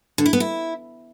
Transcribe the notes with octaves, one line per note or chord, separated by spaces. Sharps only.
D3
E4
B3
E4